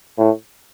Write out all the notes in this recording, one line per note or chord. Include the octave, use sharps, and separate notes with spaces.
A2